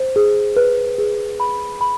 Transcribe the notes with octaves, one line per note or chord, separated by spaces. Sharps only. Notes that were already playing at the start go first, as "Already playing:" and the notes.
Already playing: C5
G#4
B4
G#4
B5
B5